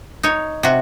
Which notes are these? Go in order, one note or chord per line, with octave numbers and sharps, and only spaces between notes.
D#4 C#5
C3 F#4